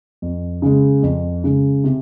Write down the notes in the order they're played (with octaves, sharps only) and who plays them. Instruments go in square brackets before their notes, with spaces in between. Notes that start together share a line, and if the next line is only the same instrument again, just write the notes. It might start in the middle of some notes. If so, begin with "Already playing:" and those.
[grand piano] F2
C#3 G#3
F2
C#3 G#3
C3